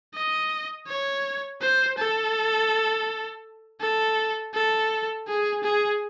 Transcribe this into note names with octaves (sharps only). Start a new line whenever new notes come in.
D#5
C#5
C5
A4
A4
A4
G#4
G#4